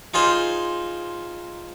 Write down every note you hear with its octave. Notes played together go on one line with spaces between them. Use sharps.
D#4 F4 G#4 C5